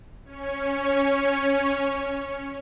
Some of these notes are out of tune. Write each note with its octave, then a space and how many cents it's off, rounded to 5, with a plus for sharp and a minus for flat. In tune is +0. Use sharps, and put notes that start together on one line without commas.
C#4 +0 C#5 +0